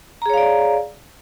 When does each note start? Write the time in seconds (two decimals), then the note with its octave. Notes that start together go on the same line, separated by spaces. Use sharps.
0.22 A#5
0.26 G#4
0.30 C#5
0.34 F5
0.38 D5